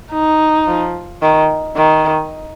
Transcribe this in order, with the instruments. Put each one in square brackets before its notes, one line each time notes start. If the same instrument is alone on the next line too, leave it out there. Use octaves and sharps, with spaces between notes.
[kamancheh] D#4
[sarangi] F3
D#3
D#3